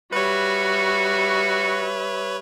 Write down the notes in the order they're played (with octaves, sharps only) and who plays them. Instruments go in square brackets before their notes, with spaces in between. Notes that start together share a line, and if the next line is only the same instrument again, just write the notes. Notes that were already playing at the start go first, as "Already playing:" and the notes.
[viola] G3 E5 [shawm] F#4 [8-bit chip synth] B4 C#5